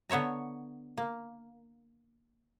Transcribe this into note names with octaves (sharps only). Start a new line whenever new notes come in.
D3 B3 C#5 E5 A#5
A#3